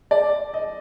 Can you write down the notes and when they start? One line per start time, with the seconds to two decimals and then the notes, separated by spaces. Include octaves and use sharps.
0.11 D5
0.54 D#5